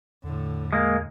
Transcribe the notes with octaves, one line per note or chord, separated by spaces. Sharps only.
E2 A2 D3
G#3 A#3